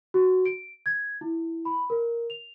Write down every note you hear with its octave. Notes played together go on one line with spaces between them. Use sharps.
F#4
D7
G#6
E4
B5
A#4
F7